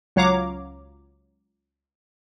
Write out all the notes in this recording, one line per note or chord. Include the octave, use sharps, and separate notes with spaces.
C#2 F#3 C#5 F5 A#5 D6